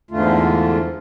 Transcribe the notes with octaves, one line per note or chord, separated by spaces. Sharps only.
E2 G#2 D3 A3 F4